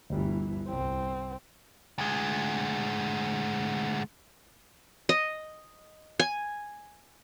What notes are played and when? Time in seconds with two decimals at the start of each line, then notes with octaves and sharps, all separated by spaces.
0.10 G1 D2 E3 G3
0.68 C2 C4
1.98 D2 G#3
5.09 D#5
6.20 G#5